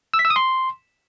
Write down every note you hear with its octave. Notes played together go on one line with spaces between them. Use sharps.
E6
B6
E6
D#6
C6